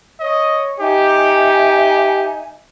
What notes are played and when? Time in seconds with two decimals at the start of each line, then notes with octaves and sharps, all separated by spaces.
0.20 C#5 D#5
0.80 D#4 G4 E5 G#5